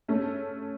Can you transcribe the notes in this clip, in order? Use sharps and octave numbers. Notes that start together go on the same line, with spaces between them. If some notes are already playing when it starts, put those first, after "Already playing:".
A3 C#4